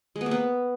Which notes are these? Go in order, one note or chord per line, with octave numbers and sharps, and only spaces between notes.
G#3
B3
A#3
B3